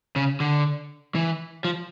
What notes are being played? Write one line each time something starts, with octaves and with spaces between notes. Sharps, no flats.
C#3
D3
E3
F3